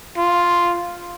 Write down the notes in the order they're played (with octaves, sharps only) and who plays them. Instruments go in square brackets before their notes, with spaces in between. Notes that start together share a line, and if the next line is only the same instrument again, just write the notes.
[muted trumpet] F4